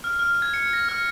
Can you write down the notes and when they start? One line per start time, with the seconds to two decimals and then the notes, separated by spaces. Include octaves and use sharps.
0.04 F6
0.19 F6
0.42 G#6
0.54 C#7
0.73 A#6
0.89 F6